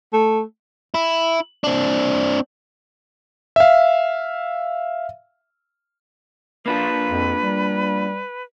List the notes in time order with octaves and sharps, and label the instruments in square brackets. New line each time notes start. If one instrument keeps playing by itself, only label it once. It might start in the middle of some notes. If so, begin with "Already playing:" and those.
[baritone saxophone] A3
[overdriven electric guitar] E4
C4 D4
[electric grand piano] E5 F5
[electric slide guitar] A#3 D4 F4 [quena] B4
[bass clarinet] F2
G3